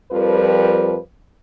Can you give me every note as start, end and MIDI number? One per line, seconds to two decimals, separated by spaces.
0.12 0.97 41
0.12 0.97 53
0.12 0.97 55
0.12 0.97 70
0.12 0.97 71